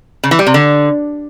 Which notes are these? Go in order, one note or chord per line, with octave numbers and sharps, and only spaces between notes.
C#3
E3
G3
C3
D3